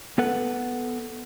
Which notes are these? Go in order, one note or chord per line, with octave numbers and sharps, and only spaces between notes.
B3 A4 B4 F#5